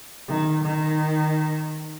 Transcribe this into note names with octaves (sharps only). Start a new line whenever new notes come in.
D#3
D#3